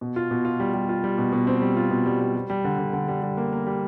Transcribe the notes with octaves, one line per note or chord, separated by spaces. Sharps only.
B2
F4
B2
F4
G3
G3
F4
G3
B2
B2
C4
G3
F4
B2
G3
G3
G3
G3
D3
D3
D3
G3
G3
A#3
A#3
G3